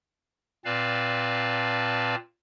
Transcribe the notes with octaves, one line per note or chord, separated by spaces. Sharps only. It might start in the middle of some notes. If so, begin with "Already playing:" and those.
A#2 C4 B4 D5 F5 A5